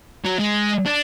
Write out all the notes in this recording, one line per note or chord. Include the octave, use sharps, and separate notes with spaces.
F#3
G#3
D4